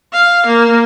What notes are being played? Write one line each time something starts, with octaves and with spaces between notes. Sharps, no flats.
F5
A#3